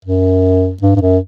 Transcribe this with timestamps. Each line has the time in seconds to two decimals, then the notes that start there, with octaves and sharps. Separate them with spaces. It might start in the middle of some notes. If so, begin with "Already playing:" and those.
0.05 F#2
0.82 G2
0.96 G2
1.02 F#2